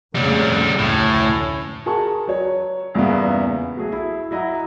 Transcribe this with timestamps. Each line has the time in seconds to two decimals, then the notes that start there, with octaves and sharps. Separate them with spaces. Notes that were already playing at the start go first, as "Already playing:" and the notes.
0.15 F2 A#2 C#3 G3 A3
0.79 F1 D2 A2 C#4
1.86 F#4 G#4 A#4 A5 C#6
2.27 F#3 C#5
2.94 E2 G2 A#2 C#3 A#3 B3
3.77 F#3 A3 G#4
3.93 E4
4.31 F#3 E4 D#5 F#5 A#5